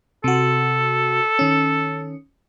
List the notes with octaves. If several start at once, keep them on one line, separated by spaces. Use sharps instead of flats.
C3 F#4 A4
D#3 C#4